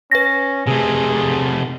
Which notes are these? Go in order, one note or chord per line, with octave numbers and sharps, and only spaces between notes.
C#4 B4 A#6
C3 A3 G#4